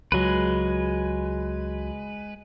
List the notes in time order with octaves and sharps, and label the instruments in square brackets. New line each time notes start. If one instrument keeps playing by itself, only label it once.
[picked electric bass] C#2 F#3 [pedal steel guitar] G#3 B4